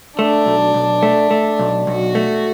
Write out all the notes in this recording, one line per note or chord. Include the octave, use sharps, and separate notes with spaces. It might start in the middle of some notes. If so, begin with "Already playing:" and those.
A3 D4
B1
B1
A3
A3
B1
B1 F#4
A3